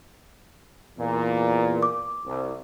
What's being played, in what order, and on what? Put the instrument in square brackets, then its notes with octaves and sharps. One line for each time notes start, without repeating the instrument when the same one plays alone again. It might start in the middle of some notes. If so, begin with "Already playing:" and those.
[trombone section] E2 A#2
[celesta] D6
[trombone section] C2